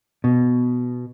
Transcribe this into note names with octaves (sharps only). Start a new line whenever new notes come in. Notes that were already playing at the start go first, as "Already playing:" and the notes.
B2